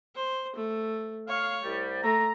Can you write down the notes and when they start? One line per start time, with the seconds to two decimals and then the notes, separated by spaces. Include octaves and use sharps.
0.15 C5
0.55 A3
1.28 C#5 F5
1.64 C2 G3
2.03 A3 A#5